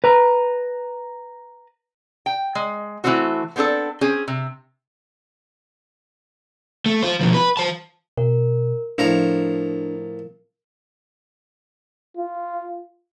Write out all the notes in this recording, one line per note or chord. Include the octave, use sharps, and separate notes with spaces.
B4 A#5
G5
G#3
E3 F#3 A3 C4 F#4
B3 C4 D4 G#4 A4
C4 C#4 G#4
C3
A3
F4 C5
B2 F3
B4
C5 A5
B2 A#4
A2 F3 D4 A#4 A#5
F4